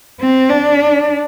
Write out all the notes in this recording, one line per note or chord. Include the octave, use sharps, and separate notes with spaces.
C4
D4